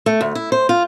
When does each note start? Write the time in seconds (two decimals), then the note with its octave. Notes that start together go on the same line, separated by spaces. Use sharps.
0.06 A3
0.21 D2
0.35 E4
0.52 C5
0.69 F4